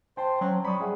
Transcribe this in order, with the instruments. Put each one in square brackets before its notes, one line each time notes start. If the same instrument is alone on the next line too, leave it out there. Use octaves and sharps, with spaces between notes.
[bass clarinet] C5 [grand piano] G5 A5
[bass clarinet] F#3 [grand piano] C#4 C5
[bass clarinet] G3 [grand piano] B5 C#6 D#6
[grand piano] G#4 E5 F#5